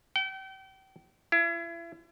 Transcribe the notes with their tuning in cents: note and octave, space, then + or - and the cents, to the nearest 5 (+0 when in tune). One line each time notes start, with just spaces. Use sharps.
G5 -35
E4 +40